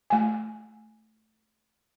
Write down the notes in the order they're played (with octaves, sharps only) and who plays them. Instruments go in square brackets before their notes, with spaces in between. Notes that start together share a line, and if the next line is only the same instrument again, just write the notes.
[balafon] A3 G#5